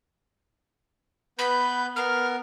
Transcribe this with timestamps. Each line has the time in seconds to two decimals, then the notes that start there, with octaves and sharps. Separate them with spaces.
1.39 B3 B4 B5 G6
1.96 B3 A#4 F6